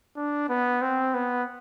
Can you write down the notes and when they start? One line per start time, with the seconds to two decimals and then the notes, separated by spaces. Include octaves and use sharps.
0.16 D4
0.49 B3
0.82 C4
1.14 B3